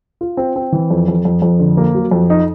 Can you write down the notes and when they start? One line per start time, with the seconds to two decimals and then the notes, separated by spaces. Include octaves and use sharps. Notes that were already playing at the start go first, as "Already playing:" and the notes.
0.21 F4
0.37 C4
0.56 C4
0.72 E3
0.91 F2
1.08 F2
1.25 F2
1.42 F2
1.59 D3
1.77 A#3
1.94 F#3
2.11 F2
2.30 D#4